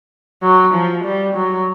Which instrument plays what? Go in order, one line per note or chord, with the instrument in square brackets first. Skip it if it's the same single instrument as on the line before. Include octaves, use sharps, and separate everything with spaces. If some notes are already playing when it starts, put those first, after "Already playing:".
[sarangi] F#3
F3
G3
F#3